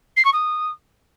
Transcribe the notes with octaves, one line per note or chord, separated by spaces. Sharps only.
C7
C#6
D#6